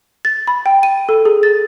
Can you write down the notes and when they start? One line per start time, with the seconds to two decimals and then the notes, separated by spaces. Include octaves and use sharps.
0.25 A6
0.47 B5
0.66 G5
0.83 D#7
1.09 A4
1.25 G#4
1.43 A6